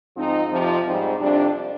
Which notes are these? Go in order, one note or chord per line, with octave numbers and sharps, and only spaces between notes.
G#2 F3 C4 D#4
F2 C3 F3
G#2 G3 C4 D#4
F2 C3 G3 D4